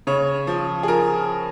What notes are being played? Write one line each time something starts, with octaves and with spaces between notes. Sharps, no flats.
C#3 C#5
F3
G#4
F3 A#4